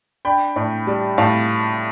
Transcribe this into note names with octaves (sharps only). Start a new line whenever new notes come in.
D4 G5 B5
A2
G3
A2 F5 A5